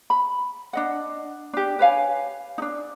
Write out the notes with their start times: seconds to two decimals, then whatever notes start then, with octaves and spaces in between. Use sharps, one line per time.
0.10 B5
0.73 D4 D#5 F#5
1.53 D4 G4
1.79 B4 C#5 F5 G#5
2.58 D4 D#4